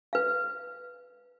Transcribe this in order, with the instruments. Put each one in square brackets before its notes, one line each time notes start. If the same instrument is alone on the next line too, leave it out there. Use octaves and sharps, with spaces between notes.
[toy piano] B4 F5